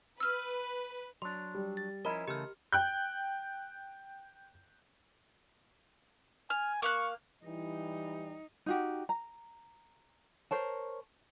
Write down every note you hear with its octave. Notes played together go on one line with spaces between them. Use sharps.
B4 E6 F6
F#3 D4 C6
G3
A6
F3 C#4 E4 A#4 D#5 A#5 B5
C#3 E3 A3 G4 F6
G5 F#6 G6
G#5 F6
A#3 F5 C#6 F#6
E3 G3 D#4
D#4 F#4 G4
A#5
A#4 C5 C#5 A5